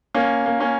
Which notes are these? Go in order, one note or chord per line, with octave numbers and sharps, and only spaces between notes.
A#3 C#4
A#3
A#3 C#4